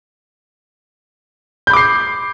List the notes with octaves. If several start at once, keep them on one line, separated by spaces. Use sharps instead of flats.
B5 D6 G6 C7